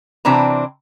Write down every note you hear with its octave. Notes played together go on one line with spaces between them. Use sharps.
C3 E3 C4 D4 A#5